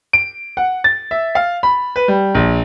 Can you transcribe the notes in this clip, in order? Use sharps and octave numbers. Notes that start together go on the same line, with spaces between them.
D7
F#5
A6
E5
F5
B5
B4
G3
A#1